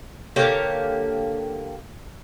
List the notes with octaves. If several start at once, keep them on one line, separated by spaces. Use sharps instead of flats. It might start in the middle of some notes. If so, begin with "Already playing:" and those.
D3 A#3 G4 C#5